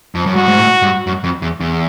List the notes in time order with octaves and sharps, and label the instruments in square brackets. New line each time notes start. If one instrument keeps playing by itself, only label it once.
[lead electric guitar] F2
F#2
[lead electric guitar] G2 [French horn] F#4
[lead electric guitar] G#2
A2
G2
F#2
F2
E2
E2